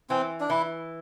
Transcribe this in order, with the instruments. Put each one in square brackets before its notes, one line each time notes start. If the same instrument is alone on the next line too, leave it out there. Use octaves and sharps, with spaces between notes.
[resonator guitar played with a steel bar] E3 [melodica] C4
[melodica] D4
[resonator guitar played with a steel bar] E3 [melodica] E4